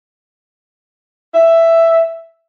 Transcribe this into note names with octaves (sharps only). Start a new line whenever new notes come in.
E5